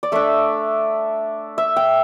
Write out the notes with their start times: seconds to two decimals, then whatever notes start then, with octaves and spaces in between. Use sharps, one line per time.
0.03 D5
0.12 A3 D4 E5
1.58 E5
1.76 G5